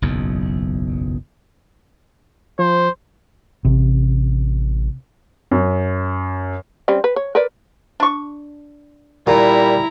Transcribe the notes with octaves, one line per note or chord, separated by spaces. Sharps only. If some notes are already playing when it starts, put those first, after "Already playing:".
F#1 B1 E2
F3 C5
A1 C3
F#2
G3 C4 C#4
B4
C#5
A#4 B4 D5
D4 C#6
A#2 G3 E4 A#5